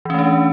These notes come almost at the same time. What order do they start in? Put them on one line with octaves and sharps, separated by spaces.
E3 C#4 A3 D4